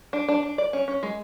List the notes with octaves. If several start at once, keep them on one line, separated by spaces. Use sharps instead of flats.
D4
D4
D4
D5
C#4
C#4
G#3